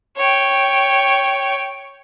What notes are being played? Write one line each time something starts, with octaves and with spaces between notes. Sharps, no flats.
C#5 G5